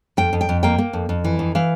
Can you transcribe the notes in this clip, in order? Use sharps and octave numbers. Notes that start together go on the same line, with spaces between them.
F2 G5
F2
G5
F2
A#3 G5
A#3
F2
F2
E3
F2
E3 F5